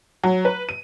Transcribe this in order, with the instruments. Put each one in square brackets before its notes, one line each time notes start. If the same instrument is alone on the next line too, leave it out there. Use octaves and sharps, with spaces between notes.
[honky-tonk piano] F#3
B4
D#7